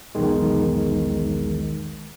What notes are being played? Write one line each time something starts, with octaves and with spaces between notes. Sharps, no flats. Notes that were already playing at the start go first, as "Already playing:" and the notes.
B1 E2 D#3 G#3